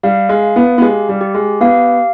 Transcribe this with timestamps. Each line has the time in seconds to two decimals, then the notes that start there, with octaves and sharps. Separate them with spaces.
0.03 G3 F5
0.29 G#3
0.43 F5
0.56 B3
0.78 B3
0.82 G#3 G4
1.09 G3
1.21 G4
1.34 G#3
1.61 B3 F5